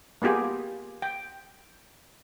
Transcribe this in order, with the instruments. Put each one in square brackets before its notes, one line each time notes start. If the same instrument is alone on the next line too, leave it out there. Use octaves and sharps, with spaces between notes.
[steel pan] A#3 B3 F4 G4 G#4
G5